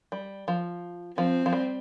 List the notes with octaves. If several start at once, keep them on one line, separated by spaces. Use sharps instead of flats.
G3
F3
F3 C4
F3
G3